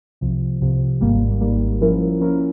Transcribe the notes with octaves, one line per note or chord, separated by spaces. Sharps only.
C2 C3 F3
C2 C3 F3
G#1 G#2 G3 A#3
G#1 G#2 G3 A#3
F3 A#3 C#4 E4 A#4
F3 A#3 C#4 E4 A#4